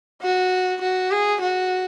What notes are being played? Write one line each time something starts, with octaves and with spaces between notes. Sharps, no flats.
F#4
F#4
G#4
F#4